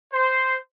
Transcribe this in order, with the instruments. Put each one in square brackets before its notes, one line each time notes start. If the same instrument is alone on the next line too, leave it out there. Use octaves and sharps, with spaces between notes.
[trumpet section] C5